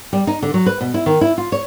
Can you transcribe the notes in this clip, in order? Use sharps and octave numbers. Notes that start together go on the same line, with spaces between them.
G3
D#4
D3
F#3
B4
B2
E4
D#3
E4
F4
C#5